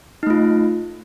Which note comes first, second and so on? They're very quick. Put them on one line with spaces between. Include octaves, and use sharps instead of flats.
D#4 A3 F4